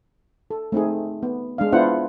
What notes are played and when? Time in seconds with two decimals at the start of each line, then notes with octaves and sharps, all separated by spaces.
0.51 A4
0.72 A3 C4 D#4 G#4
1.23 B3
1.58 G#3 D4 F5
1.72 B3 D4 E4 F4 C5 F#5